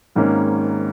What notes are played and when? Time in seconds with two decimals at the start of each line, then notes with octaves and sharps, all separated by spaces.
0.15 G#1 G#2 D#3 A#3 C#4